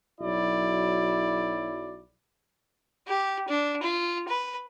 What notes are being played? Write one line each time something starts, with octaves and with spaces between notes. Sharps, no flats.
B1 F#3 E4 D5
G4
D4
F4
B4